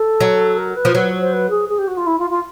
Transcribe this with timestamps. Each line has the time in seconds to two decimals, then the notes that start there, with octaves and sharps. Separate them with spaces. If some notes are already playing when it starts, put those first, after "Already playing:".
Already playing: A4
0.20 F#3
0.57 A#4
0.76 B4
0.85 F3
0.94 F#3 B4
1.20 C5
1.32 B4
1.49 G#4
1.68 G#4
1.78 G4
1.87 F#4
1.97 F4
2.06 E4
2.18 F4
2.30 F4